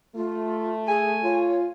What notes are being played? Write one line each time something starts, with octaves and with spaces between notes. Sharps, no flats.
A3 F4
G#4 G#5
F4 C#5